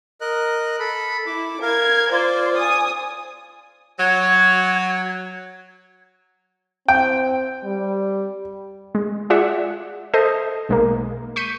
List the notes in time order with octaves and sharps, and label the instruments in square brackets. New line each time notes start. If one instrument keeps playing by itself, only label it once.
[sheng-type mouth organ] A#4 D#5 F#6
A4 B5
[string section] E4 [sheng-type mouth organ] D6
[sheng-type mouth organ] A#4 F5 [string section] G#6
[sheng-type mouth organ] F4 D5 [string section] C5
[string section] G#5 D#6
[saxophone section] F#3 [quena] G#6
[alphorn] C4 [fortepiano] G5
[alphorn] G3
[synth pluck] G#3
F4 G#4 D5 E5 F#5
A4 C5 D#5 E5
B1 G#3 A#3
C#6 G6 B6 C#7 D#7